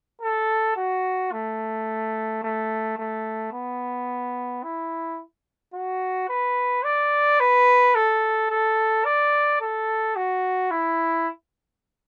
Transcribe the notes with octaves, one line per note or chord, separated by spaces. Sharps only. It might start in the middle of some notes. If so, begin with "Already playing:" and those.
A4
F#4
A3
A3
A3
B3
E4
F#4
B4
D5
B4
A4
A4
D5
A4
F#4
E4